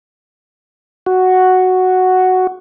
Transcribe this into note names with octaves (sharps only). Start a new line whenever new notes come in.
F#4